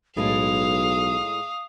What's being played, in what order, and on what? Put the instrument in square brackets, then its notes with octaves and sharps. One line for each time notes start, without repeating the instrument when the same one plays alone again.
[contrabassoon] B1 [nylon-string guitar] A2 G#3 A3 [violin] F5 [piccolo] D#6